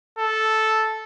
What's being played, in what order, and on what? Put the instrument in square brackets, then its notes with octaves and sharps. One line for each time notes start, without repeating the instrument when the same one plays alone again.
[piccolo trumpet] A4